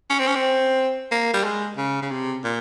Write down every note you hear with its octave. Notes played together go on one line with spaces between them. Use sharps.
C#4
C4
C#4
C4
A#3
G3
G#3
C#3
C#3
C3
A#2